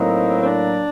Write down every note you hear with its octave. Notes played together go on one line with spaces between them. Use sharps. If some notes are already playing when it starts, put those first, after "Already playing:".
Already playing: A2 F#3 A#3 C4 D#4
C4
D4